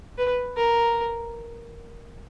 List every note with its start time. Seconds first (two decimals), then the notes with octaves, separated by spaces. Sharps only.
0.18 B4
0.57 A#4